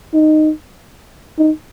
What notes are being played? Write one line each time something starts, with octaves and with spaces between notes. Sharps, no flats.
D#4
D#4